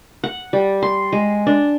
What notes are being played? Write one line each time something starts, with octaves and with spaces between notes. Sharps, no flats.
F#5
G3
C6
G#3
D4